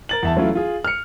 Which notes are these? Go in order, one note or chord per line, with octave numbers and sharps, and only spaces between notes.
A#4 A6 F#7
E2 E5 A5
E3 F#3 A3 C#4 E4 F4
F4 G#4
F6 C#7